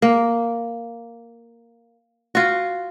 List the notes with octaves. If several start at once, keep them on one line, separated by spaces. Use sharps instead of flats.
A#3
F4 F#4